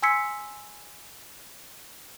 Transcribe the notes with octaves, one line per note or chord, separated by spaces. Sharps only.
G#5 C6 E6 G#6 B6 C#7